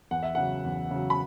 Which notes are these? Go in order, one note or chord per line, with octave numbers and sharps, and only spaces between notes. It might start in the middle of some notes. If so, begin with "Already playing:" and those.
E2 F#5
E5
C#3 F#3 F#5
E2
C#3 F#3
B5